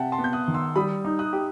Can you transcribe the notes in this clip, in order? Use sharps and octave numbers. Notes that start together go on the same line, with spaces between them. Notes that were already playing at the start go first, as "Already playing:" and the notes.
Already playing: C3 E5 F#5 G5 A5
A5 C6
B3
G6
D#6 F#6
D#3
C6 E6
G3 B5 D#6
D#4
D#6 F#6
G4